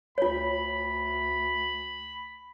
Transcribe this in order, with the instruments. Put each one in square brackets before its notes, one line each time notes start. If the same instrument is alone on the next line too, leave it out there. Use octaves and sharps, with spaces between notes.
[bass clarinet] D2 [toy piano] F4 C#5 [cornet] B5